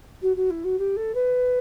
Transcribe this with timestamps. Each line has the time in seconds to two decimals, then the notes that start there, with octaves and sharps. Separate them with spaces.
0.22 F#4
0.36 F#4
0.50 E4
0.64 F#4
0.78 G4
0.96 A4
1.14 B4